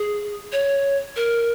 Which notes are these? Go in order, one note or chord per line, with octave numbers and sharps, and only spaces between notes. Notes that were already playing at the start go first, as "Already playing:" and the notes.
Already playing: G#4
C#5
A#4